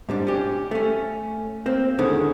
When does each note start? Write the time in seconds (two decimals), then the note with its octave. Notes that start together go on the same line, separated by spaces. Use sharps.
0.09 G#2 G3 D4
0.27 C#4 G4
0.71 A3 C#4
1.66 A#3 C4
1.98 E2 A2 D3 D#3 G#3 C#4